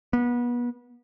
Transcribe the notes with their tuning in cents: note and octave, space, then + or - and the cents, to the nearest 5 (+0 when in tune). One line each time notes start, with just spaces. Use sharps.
B3 -30